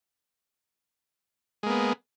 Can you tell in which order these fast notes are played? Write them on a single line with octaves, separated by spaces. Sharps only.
G#3 A#3 B3